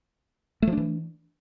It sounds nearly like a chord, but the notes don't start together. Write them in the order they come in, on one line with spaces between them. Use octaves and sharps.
A3 F3 D4 E3